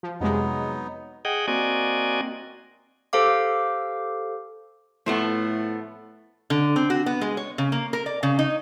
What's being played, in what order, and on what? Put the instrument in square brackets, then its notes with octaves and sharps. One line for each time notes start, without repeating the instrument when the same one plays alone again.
[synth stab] F3
[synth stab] F2 C3 G#3 [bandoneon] F#3 B3 D#4
[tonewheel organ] G#4 D#5 F#5 G5
A#3 C4 F#4 D5 D#5 G#5
[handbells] G4 A4 C5 F5 D6
[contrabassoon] A2 [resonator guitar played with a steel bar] F3 A3 B3
[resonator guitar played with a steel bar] D3
C4
F#4
B3
G#3
C#5
C#3
A#3
A#4
D5
C#3
D#4